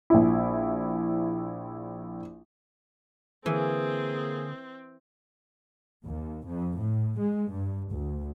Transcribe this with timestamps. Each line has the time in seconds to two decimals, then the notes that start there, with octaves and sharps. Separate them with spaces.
0.10 A#1 E4
3.46 D3 E3 A#3 C4 G#4
6.04 D#2
6.46 F2
6.77 A2
7.17 G#3
7.49 G2
7.92 D2